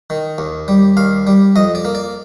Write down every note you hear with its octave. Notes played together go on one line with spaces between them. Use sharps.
D#3
D#2
G3
D#2 F5
G3
F2 D#5
D5
A#3
D5